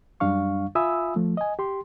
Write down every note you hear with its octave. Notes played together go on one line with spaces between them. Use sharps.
F#2 G3 D4 F5 C#6
F4 E5 G#5 B5 D#6 E6
F3 A3
D#5 G#5
G4 C6